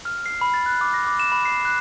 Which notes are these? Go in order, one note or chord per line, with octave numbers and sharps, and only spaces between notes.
F6
C7
B5
A6
F#6
D6
A#6
D6
E7
B5
C7
F#6